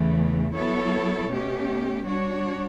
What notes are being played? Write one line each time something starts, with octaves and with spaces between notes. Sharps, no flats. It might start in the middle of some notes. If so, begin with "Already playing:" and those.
Already playing: E2 C#3 E3 A3
F#3 B3 E4 A4 C#5
B2 A3 C#4 G4
G3 D4 F#4 C#5